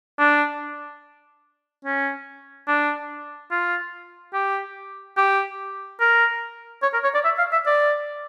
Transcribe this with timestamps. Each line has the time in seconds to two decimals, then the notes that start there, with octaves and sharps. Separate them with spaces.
0.19 D4
1.85 C#4
2.68 D4
3.51 F4
4.34 G4
5.17 G4
6.00 A#4
6.83 C#5
6.93 A#4
7.04 C#5
7.14 D5
7.24 E5
7.38 F5
7.52 E5
7.66 D5